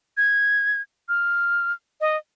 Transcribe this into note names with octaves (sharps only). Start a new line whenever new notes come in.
G#6
F6
D#5